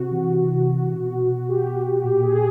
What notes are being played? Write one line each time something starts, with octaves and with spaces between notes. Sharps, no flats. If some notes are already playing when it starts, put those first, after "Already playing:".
Already playing: C3 F#4
E3
C3
E3
B2
B2 G4
A#2 G4
G#4
G#4